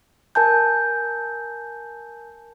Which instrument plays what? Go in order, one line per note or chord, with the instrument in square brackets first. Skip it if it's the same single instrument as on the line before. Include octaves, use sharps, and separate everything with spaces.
[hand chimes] A#4 G#5 A5 G6